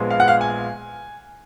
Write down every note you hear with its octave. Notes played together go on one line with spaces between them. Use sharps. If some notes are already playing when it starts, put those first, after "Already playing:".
Already playing: A#1 A#2 F3 G#3 B3
F5
F#5
F5
G#5